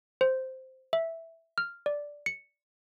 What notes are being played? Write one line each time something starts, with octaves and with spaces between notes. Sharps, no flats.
C5
E5
F6
D5
C#7